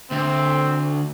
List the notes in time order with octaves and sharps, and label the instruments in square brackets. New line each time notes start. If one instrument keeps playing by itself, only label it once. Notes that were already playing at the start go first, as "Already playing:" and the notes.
[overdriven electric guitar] D2 [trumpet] C4